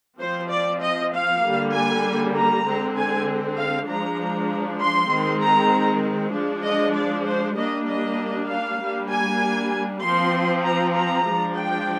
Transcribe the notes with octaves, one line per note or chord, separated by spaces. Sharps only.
F3 C4 C5
D5
D#5
F5
D3 G3 A#3
G#5
A#5
D3 G#3 C4
G#5
F5
F3 G#3 D4 A#5
C6
D#3 G#3 C4
A#5
F3 G#3 D4
D#5
D5
C5
G3 A#3 D4 D#5
D#5
F5
G3 A#3 D4
G#5
F3 C4 C6
A#5
A#5
F3 G#3 D4
G5